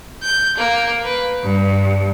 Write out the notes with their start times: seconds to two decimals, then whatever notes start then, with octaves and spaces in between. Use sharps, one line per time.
0.23 G6
0.57 A#3
1.03 B4
1.43 G2